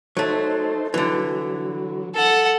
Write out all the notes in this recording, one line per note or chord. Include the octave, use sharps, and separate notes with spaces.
F#3 A3 D#4 A4 C5
D3 E3 F#3
A4 F#5